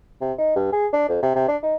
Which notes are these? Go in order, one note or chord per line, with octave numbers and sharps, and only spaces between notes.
C3
D#4
G2
G#4
D4
F2
C3
C3
D4
D#4